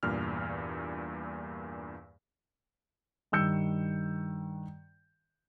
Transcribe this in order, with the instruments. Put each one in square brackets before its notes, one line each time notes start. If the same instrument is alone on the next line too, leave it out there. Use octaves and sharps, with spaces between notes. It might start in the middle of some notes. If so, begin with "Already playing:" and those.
[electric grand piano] E2 G2 A#2 F6
[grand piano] G2 D#3 E6 G6 C#7